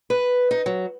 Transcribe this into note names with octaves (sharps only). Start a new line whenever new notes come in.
B4
D#4
F#3